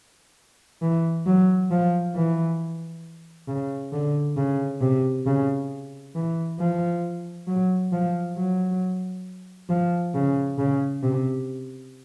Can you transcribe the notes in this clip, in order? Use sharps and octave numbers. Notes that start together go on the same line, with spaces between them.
E3
F#3
F3
E3
C#3
D3
C#3
C3
C#3
E3
F3
F#3
F3
F#3
F3
C#3
C#3
C3